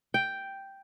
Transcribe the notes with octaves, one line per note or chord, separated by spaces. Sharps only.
G5